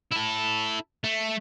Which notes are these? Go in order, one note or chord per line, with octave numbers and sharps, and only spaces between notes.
E4 A4
A3